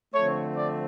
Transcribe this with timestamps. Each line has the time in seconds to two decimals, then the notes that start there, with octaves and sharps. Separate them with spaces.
0.14 D3 F3 A3 C4 C#5
0.56 D5